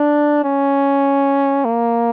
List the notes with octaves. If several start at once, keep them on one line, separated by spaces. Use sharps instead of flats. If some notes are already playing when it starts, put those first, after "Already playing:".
Already playing: D4
C#4
A#3